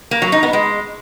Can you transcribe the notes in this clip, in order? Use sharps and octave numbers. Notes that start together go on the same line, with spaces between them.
A#3
F#3
D#4
B3
G#3